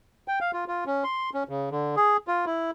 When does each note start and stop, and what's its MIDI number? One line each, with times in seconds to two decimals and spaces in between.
0.28 0.39 79
0.41 0.51 77
0.53 0.64 65
0.68 0.84 65
0.86 1.04 61
1.04 1.30 84
1.34 1.43 61
1.49 1.69 49
1.71 1.95 50
1.96 2.17 68
2.28 2.45 65
2.46 2.71 64